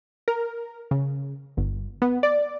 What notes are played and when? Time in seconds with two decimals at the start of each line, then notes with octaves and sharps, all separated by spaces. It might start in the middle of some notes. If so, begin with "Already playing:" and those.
0.28 A#4
0.91 C#3
1.57 G1
2.02 B3
2.23 D5